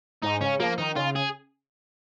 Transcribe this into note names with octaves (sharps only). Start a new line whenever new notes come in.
G#2 D#4
C#3 C#4
F3 A#3
D#3 D#4
C#3 F4
G#4